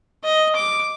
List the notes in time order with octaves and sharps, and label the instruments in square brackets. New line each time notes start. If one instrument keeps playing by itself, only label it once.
[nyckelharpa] D#5
D6